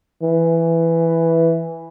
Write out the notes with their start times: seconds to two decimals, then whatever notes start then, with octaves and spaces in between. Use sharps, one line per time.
0.23 E3